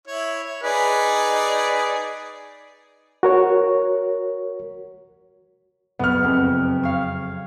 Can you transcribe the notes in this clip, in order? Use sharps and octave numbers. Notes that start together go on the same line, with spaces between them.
E4 C#5
C#5
D#4 G#4 B4 D5
F#4 A#4 C#5
F#1 B3 F6
F2
C#5 F5